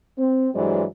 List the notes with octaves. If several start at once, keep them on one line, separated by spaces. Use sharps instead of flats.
C4
G2 E3 F#3 G#3 C5 D5